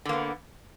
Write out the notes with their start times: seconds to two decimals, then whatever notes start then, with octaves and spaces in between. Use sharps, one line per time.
0.05 D3
0.09 A#3
0.13 B3